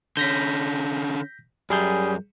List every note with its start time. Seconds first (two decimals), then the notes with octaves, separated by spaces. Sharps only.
0.17 D3 C#4 G6 A#6 B6
1.70 F#2 G3 G#4 G6